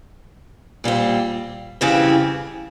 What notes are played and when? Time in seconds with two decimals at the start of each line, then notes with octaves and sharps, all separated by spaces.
0.84 A#2 G3 C4
1.81 F2 C#3 E3 G3 C4